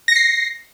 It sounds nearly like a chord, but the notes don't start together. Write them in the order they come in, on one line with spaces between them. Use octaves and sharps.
A#6 C#7 C7